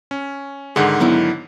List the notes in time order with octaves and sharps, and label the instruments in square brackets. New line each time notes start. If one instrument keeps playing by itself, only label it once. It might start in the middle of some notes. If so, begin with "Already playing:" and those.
[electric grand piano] C#4
[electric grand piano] G#2 D3 D#3 [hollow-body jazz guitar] G#4 F#5
[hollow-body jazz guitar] F#3 B3 E4